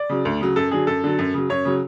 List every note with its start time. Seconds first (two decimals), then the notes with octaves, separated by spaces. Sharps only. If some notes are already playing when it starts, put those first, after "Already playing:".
Already playing: D5
0.10 C#3 F#3
0.25 D2
0.41 C#3 F#3
0.56 F#2 A4
0.71 D3 F#3 G#4
0.87 F#2 A4
1.04 D3 F#3
1.19 F#2
1.34 C#3 F#3
1.49 F#2 C#5
1.65 C#3 F#3